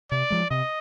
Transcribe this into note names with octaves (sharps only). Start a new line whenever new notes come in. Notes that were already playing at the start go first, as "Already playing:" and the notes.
C3 D5
F3 G#3
C3 D#5